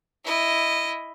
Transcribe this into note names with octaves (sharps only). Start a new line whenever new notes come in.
E4 D#5